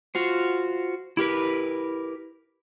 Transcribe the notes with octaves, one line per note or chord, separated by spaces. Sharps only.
F4 F#4 C5
E4 G4 A#4 B4